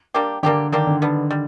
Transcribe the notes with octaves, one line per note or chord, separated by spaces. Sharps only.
G3 A#3 D4 G4
D3 G3 A#3 D4 G4
D#3 G3 A#3 D4 G4
D3
G3 B3 D4
G3